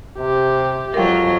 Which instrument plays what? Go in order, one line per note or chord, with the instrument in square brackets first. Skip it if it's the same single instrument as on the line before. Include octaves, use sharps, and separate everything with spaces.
[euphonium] C3 [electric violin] G4
[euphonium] F2 [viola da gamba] F#3 F4 [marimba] A#4 G5